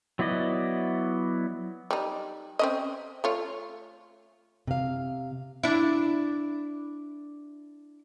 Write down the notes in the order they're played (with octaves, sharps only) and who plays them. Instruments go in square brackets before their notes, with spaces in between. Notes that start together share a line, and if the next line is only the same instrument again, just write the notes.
[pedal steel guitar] F#3 B3 E4 D5 D#5
[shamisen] G3 D#4
C4 C#4 D#5
A3 F4 C#5
[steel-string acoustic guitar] C3 F5
[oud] D4 E4